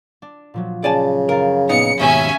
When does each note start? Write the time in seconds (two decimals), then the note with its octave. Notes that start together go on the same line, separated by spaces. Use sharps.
0.22 D4
0.54 A#2 F3 F#3
0.84 C#3 D5 G#5 A5
1.29 F#1 A#4 F5 A6
1.69 A#2 B3 D#4 C#7
1.99 D#2 G#2 B2 C#4 E5 G#5